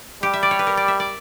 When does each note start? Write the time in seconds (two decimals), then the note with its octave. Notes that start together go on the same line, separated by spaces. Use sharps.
0.23 G3 G4
0.33 E5
0.43 D5
0.51 C#5
0.59 B4
0.67 A#4
0.77 D5
0.88 E5
1.00 D5